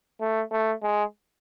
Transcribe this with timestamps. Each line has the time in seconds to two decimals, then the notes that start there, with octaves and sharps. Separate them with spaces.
0.20 A3
0.51 A3
0.82 G#3